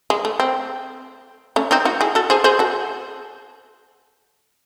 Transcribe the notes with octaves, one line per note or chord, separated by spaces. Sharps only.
G#3
A3
C4
A3 C#4
C4 D#4
D#4 F#4
E4 G#4
F#4 A4
G#4 C5
G#4 C5
F#4 A4